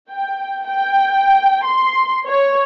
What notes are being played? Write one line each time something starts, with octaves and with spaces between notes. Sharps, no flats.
G5
G5
C6
C#5